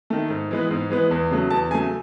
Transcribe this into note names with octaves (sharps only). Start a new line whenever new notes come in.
D#3 A3
G#2
E3 G#3 B3
G#2
E3 G#3 B3
E2
C#3 F#3 A3
E2 A5
C#3 F#3 A3 G#5